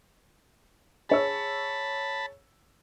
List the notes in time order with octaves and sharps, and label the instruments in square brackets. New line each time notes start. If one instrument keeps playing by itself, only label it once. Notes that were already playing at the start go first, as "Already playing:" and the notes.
[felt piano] G#4 C#5 E6 [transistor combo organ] A5 B5